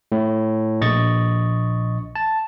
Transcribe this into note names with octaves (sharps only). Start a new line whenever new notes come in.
A2
A#1 D#5 C#6 A6
A5